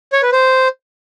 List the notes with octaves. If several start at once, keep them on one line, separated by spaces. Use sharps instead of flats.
C#5
B4
C5